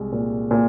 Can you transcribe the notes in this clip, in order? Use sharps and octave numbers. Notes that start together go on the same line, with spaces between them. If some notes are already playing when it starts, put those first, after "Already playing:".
Already playing: C2 G#3
A#2
A#2